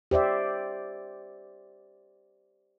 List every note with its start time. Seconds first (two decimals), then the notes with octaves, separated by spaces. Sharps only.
0.11 G4 C5 D5 E5